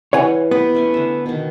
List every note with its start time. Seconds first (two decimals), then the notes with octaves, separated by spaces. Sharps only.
0.13 E3 G3 C#5 F#5 G#5
0.51 B3 G4 B4
0.75 A3 C#4 G#5
0.94 D3 E5
1.26 B2 D#3